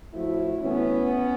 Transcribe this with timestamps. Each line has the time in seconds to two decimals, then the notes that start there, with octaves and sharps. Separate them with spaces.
0.13 A2 F3 A3 E4 F#4
0.61 A2 E3 A3 B3 C#4